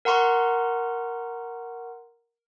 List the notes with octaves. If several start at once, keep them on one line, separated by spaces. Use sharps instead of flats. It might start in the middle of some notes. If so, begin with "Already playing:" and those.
A#4 F#5 A#5 C6 C#6